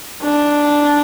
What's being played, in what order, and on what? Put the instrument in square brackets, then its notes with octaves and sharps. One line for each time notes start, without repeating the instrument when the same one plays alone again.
[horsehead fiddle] D4